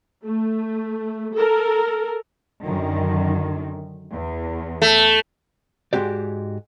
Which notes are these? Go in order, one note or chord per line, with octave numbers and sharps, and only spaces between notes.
A3
A4 A#4
F#2 D3 D#3
E2
A3
G#2 G#3 F#4 G4 D5